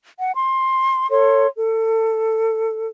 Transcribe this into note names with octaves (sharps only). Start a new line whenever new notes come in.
F#5
C6
A4 C#5 C6
A4